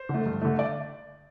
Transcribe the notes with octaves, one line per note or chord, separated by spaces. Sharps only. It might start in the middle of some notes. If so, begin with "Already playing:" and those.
Already playing: C5
D3 A3
G2
D3 A3
D5